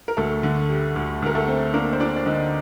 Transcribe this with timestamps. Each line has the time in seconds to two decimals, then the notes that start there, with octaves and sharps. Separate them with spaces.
0.08 A#4
0.17 D2 A3 A4
0.43 D3
0.69 G3
0.96 D2
1.22 D2 A#4
1.35 A3 A4
1.48 C4
1.74 A#3 D4 A#4
1.93 C5
2.00 D4 D5
2.17 D5
2.26 D3 D#4 D#5